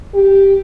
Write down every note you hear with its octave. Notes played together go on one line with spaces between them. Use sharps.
G4